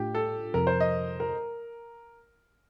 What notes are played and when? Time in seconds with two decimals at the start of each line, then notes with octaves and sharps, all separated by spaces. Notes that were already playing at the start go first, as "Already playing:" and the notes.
Already playing: A2 A3 D4 F4 G4
0.15 A4
0.54 F2 C3 F3 A#4
0.67 C5
0.80 D#5
1.20 A#4